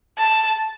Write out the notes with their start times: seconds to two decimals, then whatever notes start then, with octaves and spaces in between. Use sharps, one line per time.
0.18 A5